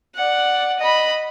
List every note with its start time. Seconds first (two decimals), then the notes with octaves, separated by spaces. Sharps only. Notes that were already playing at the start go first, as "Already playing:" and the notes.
0.15 D5 F#5
0.79 D#5 B5